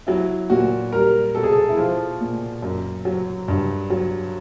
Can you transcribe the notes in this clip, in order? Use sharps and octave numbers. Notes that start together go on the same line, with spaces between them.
F#3 E4
A#2 F#4
G3 A#4
B2 A4
G#4
A4
E4
F3 F4
A#2
F#2
F#3
G2
F#3